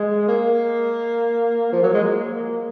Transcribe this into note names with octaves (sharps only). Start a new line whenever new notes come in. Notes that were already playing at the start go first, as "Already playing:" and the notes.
Already playing: G#3
A#3
F3
F#3
G#3
A#3